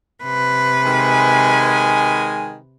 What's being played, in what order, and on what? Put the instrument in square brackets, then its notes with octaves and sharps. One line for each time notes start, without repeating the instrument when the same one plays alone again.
[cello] C3 B4
[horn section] D#3 G#3 G#5